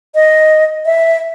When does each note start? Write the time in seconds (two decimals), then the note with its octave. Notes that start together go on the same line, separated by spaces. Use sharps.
0.15 D#5
0.86 E5